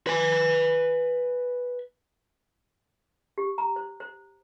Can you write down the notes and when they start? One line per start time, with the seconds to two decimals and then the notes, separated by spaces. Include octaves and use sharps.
0.07 B4 G#5
3.38 G4
3.58 A#5
3.76 C5
4.00 C5